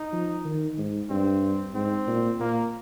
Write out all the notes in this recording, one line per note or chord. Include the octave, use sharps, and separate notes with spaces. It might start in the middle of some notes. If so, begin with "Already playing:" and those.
Already playing: D#4
F3
D#3
G#2
G2 C4
G#2 C4
A#2
A#2 A#3